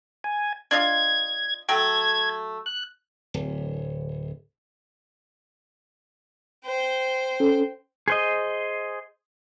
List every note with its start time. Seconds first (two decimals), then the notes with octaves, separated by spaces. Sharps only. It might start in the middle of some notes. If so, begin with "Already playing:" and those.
0.24 G#5
0.71 D4 F4 D#5 G#6
1.69 F#3 A3 G5 G#6
2.66 F#6
3.34 D1
6.65 C5 G5
7.40 C#4 A4
8.08 G#4 C5 D#5